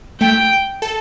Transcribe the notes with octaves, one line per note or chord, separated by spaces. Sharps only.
A3 G5
A4